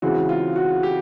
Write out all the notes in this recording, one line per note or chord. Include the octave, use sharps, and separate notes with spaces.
C#3 E3 G#3 C4 F#4
F4
F#4
G4